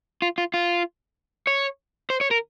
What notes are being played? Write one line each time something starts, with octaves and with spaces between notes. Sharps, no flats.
F4
F4
F4
C#5
C5
C#5
A#4